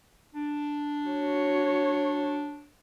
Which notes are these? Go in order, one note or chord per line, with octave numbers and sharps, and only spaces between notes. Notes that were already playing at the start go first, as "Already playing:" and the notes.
D4
F#4 C#5